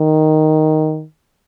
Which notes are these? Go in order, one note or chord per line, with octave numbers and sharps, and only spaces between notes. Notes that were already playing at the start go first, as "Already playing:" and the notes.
Already playing: D#3